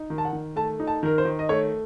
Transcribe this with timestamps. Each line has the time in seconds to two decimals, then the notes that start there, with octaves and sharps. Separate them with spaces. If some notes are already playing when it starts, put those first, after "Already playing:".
Already playing: D#4
0.10 D#3
0.18 A5
0.25 F#5
0.33 D#3
0.56 A3 A5
0.80 D#4
0.87 A5
1.03 D#3 A#4
1.18 C5
1.25 D#3
1.39 D#5
1.49 A3 C#5